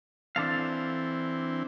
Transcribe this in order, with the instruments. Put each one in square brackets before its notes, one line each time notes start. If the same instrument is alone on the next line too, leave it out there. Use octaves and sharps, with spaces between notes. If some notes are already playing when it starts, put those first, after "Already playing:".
[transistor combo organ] E3 C4 [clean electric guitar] D4 A4 F5